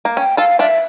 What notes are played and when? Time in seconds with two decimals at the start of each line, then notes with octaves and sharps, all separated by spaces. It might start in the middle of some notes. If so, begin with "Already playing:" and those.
0.05 A#3
0.17 C#4 G5
0.37 F4 A4 F5
0.59 D4 F4 E5